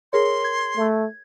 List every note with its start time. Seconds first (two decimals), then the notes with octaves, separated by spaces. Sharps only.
0.13 G#4 A#4 C#5 C6
0.44 G#6
0.77 A3